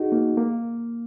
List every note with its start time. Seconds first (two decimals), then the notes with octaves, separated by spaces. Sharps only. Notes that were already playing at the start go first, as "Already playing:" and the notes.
Already playing: D#4 F#4 G#4
0.12 A#3
0.37 A#3